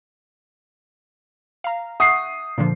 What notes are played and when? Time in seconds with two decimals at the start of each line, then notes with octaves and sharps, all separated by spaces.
1.64 F5 A#5
2.00 E5 F#5 C#6 D#6 C7
2.58 A#2 D3 F3